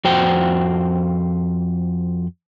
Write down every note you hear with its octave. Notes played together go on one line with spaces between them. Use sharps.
F2 F#4 C5 G5